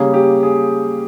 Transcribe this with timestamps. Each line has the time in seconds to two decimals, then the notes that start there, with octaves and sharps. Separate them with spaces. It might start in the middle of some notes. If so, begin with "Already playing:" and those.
Already playing: C#3 G3 A#3 C#4 G#4
0.14 G4
0.43 G#4